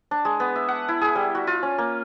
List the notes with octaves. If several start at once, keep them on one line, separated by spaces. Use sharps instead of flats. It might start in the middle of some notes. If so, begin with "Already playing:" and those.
D4
G#3
B3
E5
F#5
E4
G#4
G3
F#4
F4
C#4
A#3